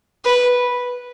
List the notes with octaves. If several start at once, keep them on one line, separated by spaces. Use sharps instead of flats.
B4